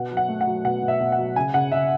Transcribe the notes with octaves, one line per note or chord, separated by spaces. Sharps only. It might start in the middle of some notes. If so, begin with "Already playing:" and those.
Already playing: B2 F#5
F#3
F#5
A3
F#5
F#3
B2 F#5
B2
E5
B2
F#5
F#3
C#3 G#5
C#3 F#5
C#3 E5